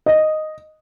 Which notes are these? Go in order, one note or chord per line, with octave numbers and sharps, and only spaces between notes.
D#5